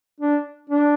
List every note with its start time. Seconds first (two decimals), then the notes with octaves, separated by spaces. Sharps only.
0.20 D4
0.70 D4